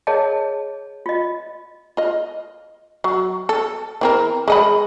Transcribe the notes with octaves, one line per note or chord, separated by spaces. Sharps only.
G#4 A#4 C#5 D#5 A5
F4 D#5
F4 D#5
F#3
A4
E3 C4 A#4
G#3 D#5 B5